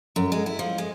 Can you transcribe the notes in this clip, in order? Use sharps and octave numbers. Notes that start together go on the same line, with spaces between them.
F#2
G#3
E4
F3
G#3